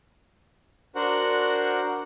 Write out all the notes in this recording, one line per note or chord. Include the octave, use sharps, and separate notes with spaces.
D4 F#4 A#4 C5 F#5